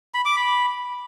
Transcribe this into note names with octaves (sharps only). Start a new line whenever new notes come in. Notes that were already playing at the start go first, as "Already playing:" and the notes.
B5
D6
B5